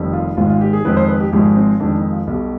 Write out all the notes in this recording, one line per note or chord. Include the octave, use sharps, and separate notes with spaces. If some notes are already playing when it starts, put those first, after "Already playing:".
Already playing: F1 F2 D#3 G3
F4
G#1 G#2 D#3 F4
F4
G4
G#4
F2 D#3 G#3 B4
C5
B4
G4
G#1 G#2 F3 G#3 G4
C4
F2 D#3 G#3 D4
D#4
F4
B1 B2 G3